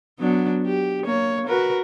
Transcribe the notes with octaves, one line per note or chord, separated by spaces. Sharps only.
F#3 B3 D4
G4
A#3 C#5
F#4 A#4 B4